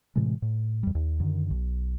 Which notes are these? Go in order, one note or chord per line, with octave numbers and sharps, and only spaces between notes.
A2 C3 E3 G#3
A2
F2 G3
D#2
F#2 D3 D#3
B1